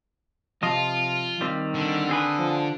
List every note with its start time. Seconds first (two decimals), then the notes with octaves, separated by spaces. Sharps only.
0.63 C3 F3 F4 D#5
1.41 D#3 G3 C4
1.74 D3
2.09 C4 G#4 B4
2.39 F3